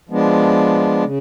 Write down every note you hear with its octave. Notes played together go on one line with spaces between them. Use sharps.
F3 G#3 B3 D4
C#3